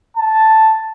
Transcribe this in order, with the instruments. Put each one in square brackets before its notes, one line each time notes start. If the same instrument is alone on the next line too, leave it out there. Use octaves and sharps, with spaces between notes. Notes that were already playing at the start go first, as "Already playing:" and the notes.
[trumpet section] A5